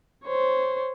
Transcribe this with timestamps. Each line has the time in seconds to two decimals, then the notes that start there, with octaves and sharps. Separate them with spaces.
0.24 C5 C#5